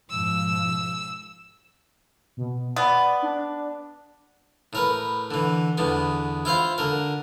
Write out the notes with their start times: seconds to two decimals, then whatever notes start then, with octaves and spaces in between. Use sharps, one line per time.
0.10 G#2 B2 F3 E6
2.37 B2
2.76 B3 D5
3.22 D4
4.73 A2 A#4 B4
5.31 D3 E3
5.78 E2 D3 B3
6.45 E4 F4 C5 F5
6.78 D3 A#4